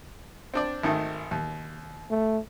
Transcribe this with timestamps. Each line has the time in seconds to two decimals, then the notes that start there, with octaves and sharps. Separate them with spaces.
0.54 C4 D4 D5
0.83 G#1 D#3 A3
1.31 D#2
2.10 A3